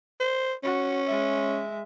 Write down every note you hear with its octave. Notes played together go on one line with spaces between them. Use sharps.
C5
C#4 F#4
G#3 E5